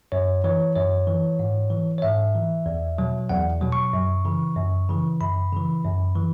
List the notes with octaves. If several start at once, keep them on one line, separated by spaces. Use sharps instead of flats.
F#2 C#5
E3 C#5
F#2 C#5
E3
G#2
E3
C#5
G#2 E5
E3
E2
B2 F#3
E2 F#5
B2 F#3
C#6
F#2
C#3 E3
F#2
C#3 E3
F#2 B5
C#3 E3
F#2
E3